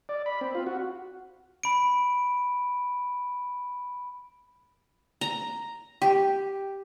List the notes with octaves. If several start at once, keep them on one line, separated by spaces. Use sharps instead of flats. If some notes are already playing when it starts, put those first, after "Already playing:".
D5
B5
C4
F4
F#4
B5 D7
A#5
G4